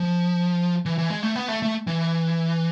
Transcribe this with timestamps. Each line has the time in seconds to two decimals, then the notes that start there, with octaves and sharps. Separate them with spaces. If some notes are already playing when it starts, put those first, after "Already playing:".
Already playing: F3
0.86 E3
0.98 E3
1.10 G#3
1.23 A3
1.36 B3
1.48 A3
1.62 A3
1.87 E3